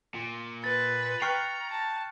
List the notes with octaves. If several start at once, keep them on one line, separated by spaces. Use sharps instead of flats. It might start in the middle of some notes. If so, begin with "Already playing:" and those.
A#2
B4 A6
G5 A#5 C#6 F6 F#6 C7 C#7
A5